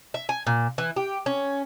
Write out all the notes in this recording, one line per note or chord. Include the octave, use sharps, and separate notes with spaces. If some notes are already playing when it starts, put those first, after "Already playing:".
E5
G#5
A#2
E3
G4
C#4